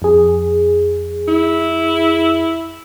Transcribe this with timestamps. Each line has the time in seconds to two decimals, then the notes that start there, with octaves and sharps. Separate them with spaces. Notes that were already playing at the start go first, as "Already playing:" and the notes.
0.02 F2 G#4
1.28 E4